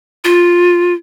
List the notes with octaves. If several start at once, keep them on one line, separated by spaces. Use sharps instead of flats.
F4